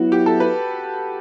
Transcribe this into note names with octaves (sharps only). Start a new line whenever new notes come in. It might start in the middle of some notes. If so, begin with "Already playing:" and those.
Already playing: F#3 B3 E4 F#4
G4
A4
B4